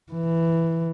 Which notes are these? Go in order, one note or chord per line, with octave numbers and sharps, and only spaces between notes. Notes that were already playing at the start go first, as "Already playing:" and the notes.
E3